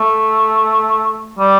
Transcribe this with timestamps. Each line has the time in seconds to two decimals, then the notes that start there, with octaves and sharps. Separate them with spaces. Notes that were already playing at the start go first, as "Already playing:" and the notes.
Already playing: A3
1.39 G3